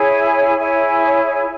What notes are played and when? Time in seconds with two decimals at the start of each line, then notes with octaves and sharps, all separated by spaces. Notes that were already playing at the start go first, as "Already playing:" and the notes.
Already playing: E4 G#4 C#5 G#5
0.58 E4 G#4 C#5 G#5